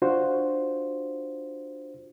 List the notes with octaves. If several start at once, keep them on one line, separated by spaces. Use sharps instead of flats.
D4 F4 F#4 C5